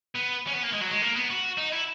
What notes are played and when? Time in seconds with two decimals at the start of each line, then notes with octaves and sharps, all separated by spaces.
0.15 B3
0.48 C#4
0.54 B3
0.64 A#3
0.73 G#3
0.81 F#3
0.91 G#3
1.02 A#3
1.16 B3
1.30 F#4
1.58 D#4
1.72 E4